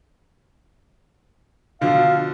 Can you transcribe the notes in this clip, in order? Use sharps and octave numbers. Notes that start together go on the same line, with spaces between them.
B2 D3 F3 F5